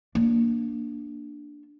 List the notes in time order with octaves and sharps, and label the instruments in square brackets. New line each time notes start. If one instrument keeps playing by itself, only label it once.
[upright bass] A#3 D4